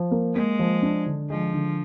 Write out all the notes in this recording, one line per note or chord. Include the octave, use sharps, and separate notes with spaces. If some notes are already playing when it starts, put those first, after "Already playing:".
Already playing: F3
A#3
G#3 A#3
F3
D4
D3
F3 G#3
D3